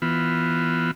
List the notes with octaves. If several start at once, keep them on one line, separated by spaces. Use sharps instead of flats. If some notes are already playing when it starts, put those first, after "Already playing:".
E3 B3 F4